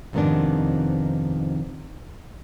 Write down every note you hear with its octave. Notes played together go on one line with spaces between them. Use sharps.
F2 G#2 C3 D#3 B3 D4